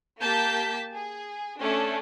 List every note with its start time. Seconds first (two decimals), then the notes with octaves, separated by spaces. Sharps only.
0.20 A#3 G4 A5 G6 B6
0.92 G#4
1.59 A3 C#4 D4